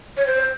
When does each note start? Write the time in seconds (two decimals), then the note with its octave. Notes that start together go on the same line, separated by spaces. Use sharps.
0.17 C#5
0.27 C5